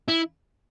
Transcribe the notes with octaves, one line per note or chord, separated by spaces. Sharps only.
E4